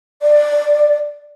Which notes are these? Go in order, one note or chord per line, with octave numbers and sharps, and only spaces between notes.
D5